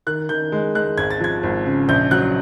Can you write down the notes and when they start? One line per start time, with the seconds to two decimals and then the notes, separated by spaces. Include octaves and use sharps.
0.07 D#3 F#6
0.29 D#3 G6
0.52 G#3
0.75 G#3 F#6
0.98 G#1 G#6
1.11 A6
1.20 F3 G#6
1.43 G#1
1.66 C#3
1.89 A#1 G6
2.11 F#3 F#6